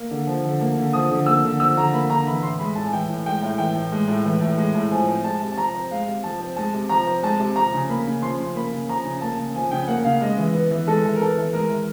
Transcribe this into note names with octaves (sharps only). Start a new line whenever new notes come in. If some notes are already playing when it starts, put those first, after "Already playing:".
Already playing: A#3
D3
F3
D3
A#3
D3
F3 D#6
D3
A#3 E6
D3
F3 E6
D3 A#5
A#3 B5
D3 A#5
E3 B5
A2 C6
G#3 B5
A2 A5
G#5
E3 G5
A2
G#3 G5
A2
E3 G5
A2
G#3
A2
E3
A2
G#3
A2
F3 G#5
C4
G#3 A5
C3
A5
F3 A#5
C4
G#3 F5
C3
F3 A5
C4
G#3 A5
C3
F3 A#5
C4
G#3 A5
C3
F3 A#5
C#3
A#3 B5
C#3
F3 C6
C#3
A#3 B5
C#3
F3 A#5
C#3
A#3 A5
C#3
F3 G#5
C#3 G5
A#3 F#5
C#3 F5
G#3 D#5
E3
B3
E3
G#3 A4
E3
A#4
B3 A4
E3
G#3 A#4
E3